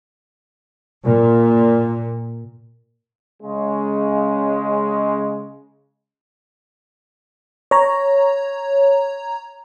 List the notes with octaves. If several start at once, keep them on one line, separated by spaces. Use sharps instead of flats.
A#2
C#3 G#3
C#5 A#5